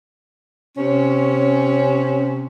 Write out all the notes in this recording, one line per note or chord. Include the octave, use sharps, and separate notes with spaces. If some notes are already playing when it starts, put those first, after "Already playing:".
C3 C#4